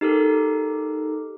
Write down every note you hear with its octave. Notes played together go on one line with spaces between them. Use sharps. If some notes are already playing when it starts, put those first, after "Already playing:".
D#4 G4 A4 A#4